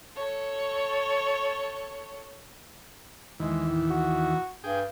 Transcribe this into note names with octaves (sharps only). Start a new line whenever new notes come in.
A4 C#5
D#2 E3 G#3
A2
F#4
G2 G#4 G5